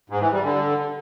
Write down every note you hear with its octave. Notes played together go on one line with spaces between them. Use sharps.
G#2
E3
G3
D3